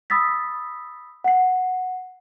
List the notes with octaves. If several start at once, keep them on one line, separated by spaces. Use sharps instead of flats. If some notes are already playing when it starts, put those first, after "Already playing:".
B5 D#6 E6 A6 B6
F#5 C7